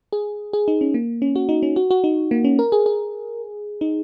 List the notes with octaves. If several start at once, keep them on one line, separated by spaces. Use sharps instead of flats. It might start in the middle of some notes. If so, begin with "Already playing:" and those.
G#4
G#4
D#4
C#4
A#3
C#4
F#4
D#4
C#4
F#4
F#4
D#4
A#3
C#4
A#4
G#4
G#4
D#4